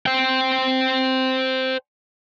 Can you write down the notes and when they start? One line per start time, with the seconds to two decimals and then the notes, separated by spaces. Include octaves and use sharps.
0.06 C5 G5